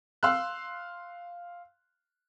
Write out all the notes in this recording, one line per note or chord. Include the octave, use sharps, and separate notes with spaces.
F5 C6 E6 F#6